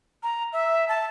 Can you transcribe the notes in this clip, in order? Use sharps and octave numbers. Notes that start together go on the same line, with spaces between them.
A#5
E5
A5